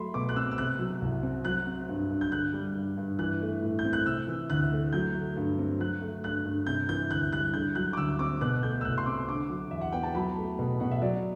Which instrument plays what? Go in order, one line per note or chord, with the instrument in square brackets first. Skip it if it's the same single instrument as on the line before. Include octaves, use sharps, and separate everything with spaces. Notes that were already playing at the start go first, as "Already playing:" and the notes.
Already playing: [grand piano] F#3 A3 E5 B5 C6
B2 D6
F#6
C4 E6
E6
C3 F#6
F#3
C2
C4
F#3 F#6
C4
G2
G2
G6
D3 F#6
G3
G2
G2
E3 F#6
A3
A2
G6
C4
F#6
C3 E6
E3
D2 F#6
A3
F#3 G6
A3
G2
C4
F#3 F#6
A3
G2 F#6
G2
C3 G6
E3 G6
D2 F#6
G3 F#6
D3 G6
F#3 F#6
D6
D2 E6
C4 D6
B2 F#6
A3 G6
E6
C2 F#6
C6
C4 D6
D3 D6
F#3
E2 E5
F#5
B3 G5
A5
F#3 B5
A3
B2
B2 F#5
E5
F#3 D5